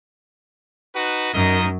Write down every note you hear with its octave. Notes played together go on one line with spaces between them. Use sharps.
D#4 F#4 B4
F#2 D#4 A#4 D#5